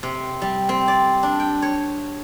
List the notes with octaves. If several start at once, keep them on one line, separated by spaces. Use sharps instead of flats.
C3
G3
C4
D5
D4
G5
C#5